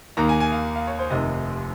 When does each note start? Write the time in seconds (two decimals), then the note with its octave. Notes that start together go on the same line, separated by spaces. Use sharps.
0.17 D#2 D#3 A#3 A#5
0.29 G#5
0.40 G#5
0.52 F5
0.76 F5
0.87 C#5
0.99 C5
1.10 F1 F2 C3 D#3 D#5